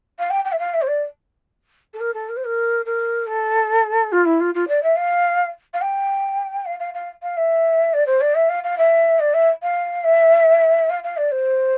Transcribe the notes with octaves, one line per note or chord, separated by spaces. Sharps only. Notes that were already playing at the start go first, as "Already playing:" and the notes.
F5
G5
G5
E5
F5
E5
C5
D5
A4
A#4
A4
A#4
C5
A#4
A#4
A4
F4
E4
F4
F4
D5
E5
F5
F5
G5
F5
F5
F5
F5
E5
D5
C5
D5
E5
F5
F5
E5
D5
E5
F5
E5
F5
F5
D5
C5